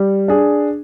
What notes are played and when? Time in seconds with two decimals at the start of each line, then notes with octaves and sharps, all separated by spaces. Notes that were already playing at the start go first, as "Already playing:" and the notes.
Already playing: G3
0.28 D4 G#4